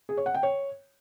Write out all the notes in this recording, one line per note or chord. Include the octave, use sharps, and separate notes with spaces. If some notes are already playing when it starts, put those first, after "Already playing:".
G#4
C#5
F#5
G5
C#5